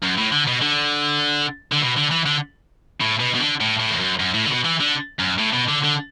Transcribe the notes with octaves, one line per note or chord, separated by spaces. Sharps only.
F#2
A2
D3
B2
D3
D3
B2
D3
E3
D3
A2
B2
B2
D3
A2
A2
E2
F#2
F#2
A2
D3
B2
E3
D3
F#2
A2
B2
D3
D3